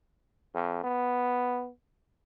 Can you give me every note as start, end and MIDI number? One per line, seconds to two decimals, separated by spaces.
0.55 0.81 41
0.84 1.70 59